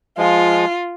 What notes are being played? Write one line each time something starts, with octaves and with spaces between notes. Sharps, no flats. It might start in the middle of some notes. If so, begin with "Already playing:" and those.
F3 G#3 F4